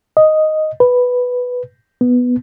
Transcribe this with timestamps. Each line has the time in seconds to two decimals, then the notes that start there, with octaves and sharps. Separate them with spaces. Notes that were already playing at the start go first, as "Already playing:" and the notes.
0.17 D#5
0.80 B4
2.01 B3